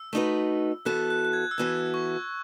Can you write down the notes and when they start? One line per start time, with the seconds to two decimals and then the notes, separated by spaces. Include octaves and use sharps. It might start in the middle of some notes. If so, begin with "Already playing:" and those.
Already playing: E6
0.13 A3 D#4 F#4 B4
0.85 E3 B3 F#4 A4 F#6
1.10 F#6
1.25 F#6
1.33 G#6
1.51 E6
1.58 E3 B3 F#4 A4 F#6
1.94 C#6